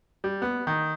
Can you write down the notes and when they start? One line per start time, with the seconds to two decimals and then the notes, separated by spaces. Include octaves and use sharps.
0.24 G3
0.42 B3
0.67 D#3